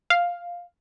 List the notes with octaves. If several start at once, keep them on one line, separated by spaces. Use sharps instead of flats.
F5